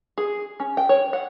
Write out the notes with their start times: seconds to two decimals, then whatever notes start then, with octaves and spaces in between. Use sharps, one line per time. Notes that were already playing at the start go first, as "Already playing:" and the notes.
0.18 G#4
0.60 C#4
0.77 G5
0.89 C#5
1.13 F#5